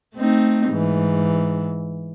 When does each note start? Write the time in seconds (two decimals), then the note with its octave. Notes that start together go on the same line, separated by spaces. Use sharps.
0.15 A3 C4 D#4
0.70 G#2 E3